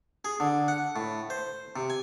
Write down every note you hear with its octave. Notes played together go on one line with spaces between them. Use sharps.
G#4
D3
F#5
A2
C5
C3
G#5